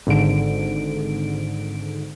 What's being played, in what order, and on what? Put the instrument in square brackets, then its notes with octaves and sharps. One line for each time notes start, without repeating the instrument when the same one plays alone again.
[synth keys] G#1 G#2 D3 D7